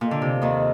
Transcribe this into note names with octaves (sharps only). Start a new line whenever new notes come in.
A#2 F4 A4 D#5
D3
C3
D#2 D#3